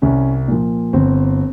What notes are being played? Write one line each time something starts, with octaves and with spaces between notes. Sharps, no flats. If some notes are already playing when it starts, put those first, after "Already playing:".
C2 C#4
A#2 F3
G1 C4